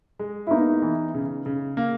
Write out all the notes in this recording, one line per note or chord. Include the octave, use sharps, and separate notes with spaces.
G#3
E4
A#3 B3 D#4
E3
C#3
C#3
A#3